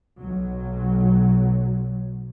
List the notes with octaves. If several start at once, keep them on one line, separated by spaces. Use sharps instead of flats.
B1 F#3